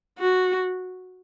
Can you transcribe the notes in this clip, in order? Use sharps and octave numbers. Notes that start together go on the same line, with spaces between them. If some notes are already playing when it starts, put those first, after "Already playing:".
F#4